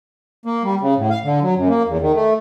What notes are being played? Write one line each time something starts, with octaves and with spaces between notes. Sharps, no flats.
A#3
G3
C#3
A2
F5
D3
F#3
F#2
A#3
E2
D#3
A3